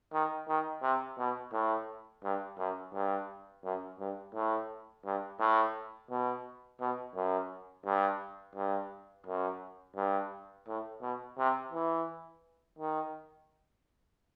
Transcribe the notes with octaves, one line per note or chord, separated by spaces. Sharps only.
D#3
D#3
C3
B2
A2
G2
F#2
G2
F#2
G2
A2
G2
A2
B2
B2
F#2
G2
G2
F#2
G2
A2
B2
C3
E3
D#3